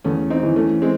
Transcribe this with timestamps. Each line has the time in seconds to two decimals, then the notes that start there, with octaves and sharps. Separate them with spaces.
0.04 E2 A3 C#4
0.30 C4 D#4
0.43 E3
0.56 A3 C#4
0.82 G#3 C4